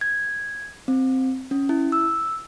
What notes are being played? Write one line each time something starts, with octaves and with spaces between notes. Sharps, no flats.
G#6
C4
C#4
E4
E6